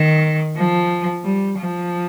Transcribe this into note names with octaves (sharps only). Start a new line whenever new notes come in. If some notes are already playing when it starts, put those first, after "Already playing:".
Already playing: D#3
F3
G3
F3